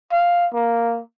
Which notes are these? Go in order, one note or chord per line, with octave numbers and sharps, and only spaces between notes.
F5
A#3